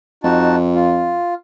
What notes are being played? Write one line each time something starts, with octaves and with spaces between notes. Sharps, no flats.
F2 D#4 F#4 A5
F4